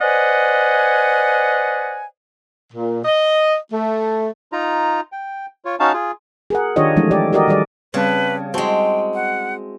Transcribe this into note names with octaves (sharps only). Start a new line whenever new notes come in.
B4 C5 D5 D#5 F#5 G#5
A#2
D#5
A3
D#4 F4 A#5
G5
F4 C#5
C#4 D#4 F#4 F5 A5
F4 G#4
G#4 A#4 F#5
D#3 D4 F4 G4 C#5 D#5
E3 F3 G#3 A3 C#4 D#4
G4 A4 D5
F#4 G4 A#4 D5 D#5
D#3 G3 G#4 D5
C#3 G3 C4 B4 A5
G#3 C4 E4 F#4 G5 A5
F#5